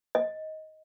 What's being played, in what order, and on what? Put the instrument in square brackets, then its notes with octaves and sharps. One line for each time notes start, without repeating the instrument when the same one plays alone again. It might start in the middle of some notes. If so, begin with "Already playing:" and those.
[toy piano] D#5